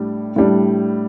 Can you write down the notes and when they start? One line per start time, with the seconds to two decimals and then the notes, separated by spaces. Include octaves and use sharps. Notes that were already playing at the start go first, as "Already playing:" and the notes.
Already playing: A2 G3 D4
0.36 A2 G3 D4